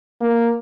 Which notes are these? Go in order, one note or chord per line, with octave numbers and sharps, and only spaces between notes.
A#3